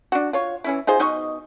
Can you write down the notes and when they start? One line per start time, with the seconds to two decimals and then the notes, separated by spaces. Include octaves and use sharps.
0.12 D4 F#4
0.33 F4 C#5
0.64 E3 C#4 E4
0.87 D#4 F4 G#4 C5
0.99 B2 D#4 D#5 C#6